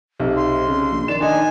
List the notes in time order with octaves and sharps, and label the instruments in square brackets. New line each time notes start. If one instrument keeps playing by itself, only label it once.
[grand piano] B1 [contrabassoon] C3
[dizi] C6
[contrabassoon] C#3
A#1
[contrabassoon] D#3 [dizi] D5 [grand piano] E7
[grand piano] D4 D#4 [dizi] G#5